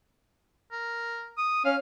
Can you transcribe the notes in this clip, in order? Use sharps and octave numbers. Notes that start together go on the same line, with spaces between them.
A#4
D#6
C#4 F5